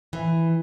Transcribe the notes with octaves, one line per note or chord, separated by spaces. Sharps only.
E3